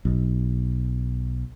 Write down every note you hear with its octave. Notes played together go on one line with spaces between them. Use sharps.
B1